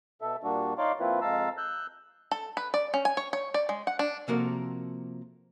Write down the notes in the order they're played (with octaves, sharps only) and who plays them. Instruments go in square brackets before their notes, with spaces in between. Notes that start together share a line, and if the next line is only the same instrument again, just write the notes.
[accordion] B2 A4 E5
A#2 G3 A#3 D4 F#4
D#4 C#5 D5 F5 C6 D6
F3 A#3 C4 E4 F4 B4
F2 G#3 F5 A5 A#5 E6
E6 F#6 G6
[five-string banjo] A4
B4
D5
C#4
G#5
C#5
C#5
D5
G#3
F#5
D4
[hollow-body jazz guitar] C3 F3 A#3 F#4 A4 A#4